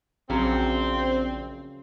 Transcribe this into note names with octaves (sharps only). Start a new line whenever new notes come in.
A#1 C#3 F#3 C4